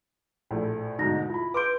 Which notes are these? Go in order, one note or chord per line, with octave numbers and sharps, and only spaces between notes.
A#1 A2 A3
D2 G#2 B2 D#4 A#6
E4 F4 B5
B4 C6 D6 G6 D7